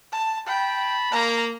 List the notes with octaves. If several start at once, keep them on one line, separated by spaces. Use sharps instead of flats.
A5
G5 A5 B5
A#3 A#5